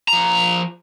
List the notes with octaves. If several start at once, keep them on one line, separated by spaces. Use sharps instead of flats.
F3 A#5